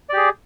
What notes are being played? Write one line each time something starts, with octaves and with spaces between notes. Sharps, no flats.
G4 G#4 D5